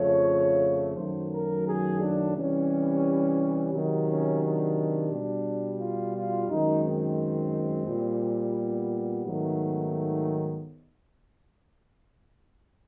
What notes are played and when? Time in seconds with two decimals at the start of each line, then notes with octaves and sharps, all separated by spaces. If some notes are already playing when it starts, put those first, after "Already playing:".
Already playing: F2 C#3 F3 A3 C#5
0.96 F#2 D#3 F#3 A3 C5
1.31 A#4
1.65 G#4
2.00 D4
2.35 C3 E3 G3 C#4
3.72 C3 D#3 F#3
4.07 C#4
4.41 D4
5.11 B2 G3
5.79 F4
6.15 F4
6.48 F#2 D#3 G#3 D#4
6.83 C4
7.87 A#2 G3
8.57 B3
9.25 G#2 D#3 F#3 A3